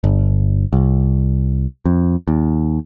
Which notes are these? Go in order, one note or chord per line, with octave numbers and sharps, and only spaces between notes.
G1
C2
F2
D#2